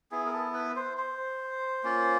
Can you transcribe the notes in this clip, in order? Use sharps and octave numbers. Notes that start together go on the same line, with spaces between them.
B3 E4 G#4
A#4
A4
B4
C5
C5
A#3 C#4 F4